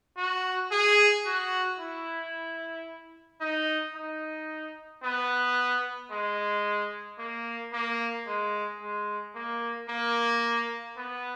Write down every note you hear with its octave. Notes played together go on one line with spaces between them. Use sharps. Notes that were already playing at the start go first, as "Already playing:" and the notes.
F#4
G#4
F#4
E4
D#4
D#4
B3
G#3
A#3
A#3
G#3
G#3
A#3
A#3
B3